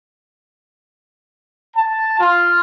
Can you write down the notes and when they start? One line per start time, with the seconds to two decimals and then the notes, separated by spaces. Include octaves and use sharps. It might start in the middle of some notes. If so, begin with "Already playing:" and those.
1.77 A5
2.19 F4